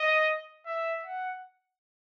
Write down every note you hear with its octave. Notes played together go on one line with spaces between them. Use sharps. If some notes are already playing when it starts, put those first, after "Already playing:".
Already playing: D#5
E5
F#5